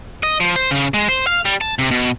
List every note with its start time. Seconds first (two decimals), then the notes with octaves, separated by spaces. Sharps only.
0.23 D#5
0.40 F3
0.56 C5
0.71 C#3
0.94 G#3
1.08 C5
1.27 F5
1.45 G3
1.61 A5
1.79 C3
1.91 B2